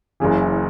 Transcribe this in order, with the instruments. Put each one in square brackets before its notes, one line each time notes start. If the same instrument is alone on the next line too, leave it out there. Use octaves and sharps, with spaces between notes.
[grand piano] F#1 F#2 C#3 E3